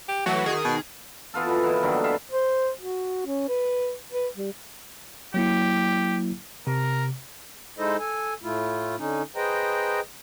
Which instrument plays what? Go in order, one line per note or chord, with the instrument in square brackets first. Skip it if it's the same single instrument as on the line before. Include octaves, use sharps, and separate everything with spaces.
[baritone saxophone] G4
[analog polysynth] E3 F#3 A3 [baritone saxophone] F#4
[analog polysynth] D#3 G#4
[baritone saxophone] B2
[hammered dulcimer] E3 B3 F4 A4
B2
E3 A#3 B3
D3 D#3 F#3 G3
B3 E5 F5
[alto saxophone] C5
F#4
C#4
B4
B4
G3
[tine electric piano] F#3 A#3 E4 [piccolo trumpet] G4
[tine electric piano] C3 [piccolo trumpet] A#4
[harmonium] G#3 D#4 E4 A4 C5 D#5
A4 G#5
A2 A3 E4 F4
D3 C#4 D#4
G#4 B4 C5 D#5 G5 A#5